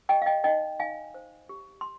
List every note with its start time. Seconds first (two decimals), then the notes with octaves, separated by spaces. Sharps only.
0.09 G4 D#5 G5
0.22 F5
0.26 D#5 G5
0.44 D#4 D#5 G5
0.80 D#4 F5 G#5
1.14 C5
1.49 G4
1.81 C6